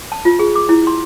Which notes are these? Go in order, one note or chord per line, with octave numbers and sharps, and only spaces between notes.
A5
F4
G#4
D6
E4
C6